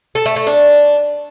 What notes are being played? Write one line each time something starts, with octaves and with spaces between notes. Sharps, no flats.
A4
A3
A3
D4